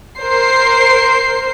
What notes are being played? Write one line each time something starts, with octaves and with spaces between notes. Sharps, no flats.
A#4 C5 C7